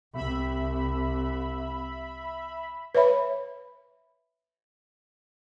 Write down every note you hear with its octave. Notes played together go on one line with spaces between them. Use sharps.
C2 E5 B5
B4 C#5 E5 B5